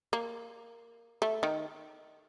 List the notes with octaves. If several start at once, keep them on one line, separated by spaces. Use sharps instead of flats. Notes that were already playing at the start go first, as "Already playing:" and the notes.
A#3
A3
D#3